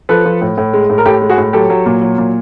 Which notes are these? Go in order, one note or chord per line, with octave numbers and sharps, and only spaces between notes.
F3 A4 B4
F3
A2
A2
G#3
A2
A#4
A2 G4 A4
G#3
F#4 G#4
A2
F#3 G4 A4
F#3
A#2
F#3
A#2